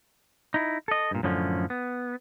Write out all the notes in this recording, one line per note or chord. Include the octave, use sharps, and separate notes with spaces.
D#4 E4
A4 D#5
G2 A#2
F#2 A2 D3 F3 C#4
B3